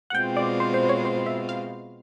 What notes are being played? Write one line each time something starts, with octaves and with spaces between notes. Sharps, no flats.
F#5
B2 G#3 C4 F4 G5
D5
C5
C5
C#5
C5
E5
F5